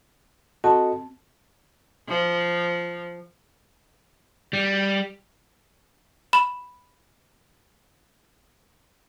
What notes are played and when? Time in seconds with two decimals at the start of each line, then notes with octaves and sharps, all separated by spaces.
0.64 C4 F#4 A4 D#5 A5
2.08 F3
4.53 G3
6.33 B5 E7